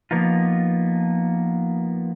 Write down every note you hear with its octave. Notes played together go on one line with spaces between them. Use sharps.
F3 A#3 B3 D#4 F4